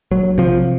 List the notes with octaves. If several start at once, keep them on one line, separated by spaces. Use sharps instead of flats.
A#1 F#3
C3 F3